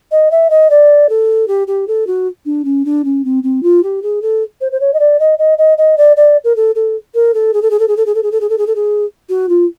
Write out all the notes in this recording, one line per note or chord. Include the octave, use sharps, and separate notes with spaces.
D#5
E5
D#5
D5
A4
G4
G4
A4
F#4
D4
C#4
D4
C#4
C4
C4
F4
G4
G#4
A4
C5
C5
C#5
D#5
D5
D#5
D#5
D#5
D#5
D5
D5
A#4
A4
A4
A#4
A4
G#4
A4
G#4
A4
G#4
A4
G#4
A4
G#4
A4
G#4
A4
G#4
A4
G#4
F#4
F4